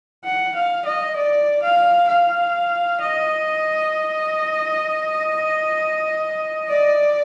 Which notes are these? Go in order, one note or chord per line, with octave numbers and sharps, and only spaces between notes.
F#5
F5
D#5
D5
F5
F5
D#5
D5